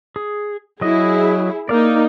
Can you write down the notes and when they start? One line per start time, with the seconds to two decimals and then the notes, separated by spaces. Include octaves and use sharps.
0.16 G#4
0.81 F#3 E4 G#4 D#5
1.69 A#3 D#4 D5 F5